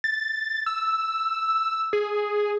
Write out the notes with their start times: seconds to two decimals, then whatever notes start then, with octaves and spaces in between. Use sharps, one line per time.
0.04 A6
0.66 E6
1.93 G#4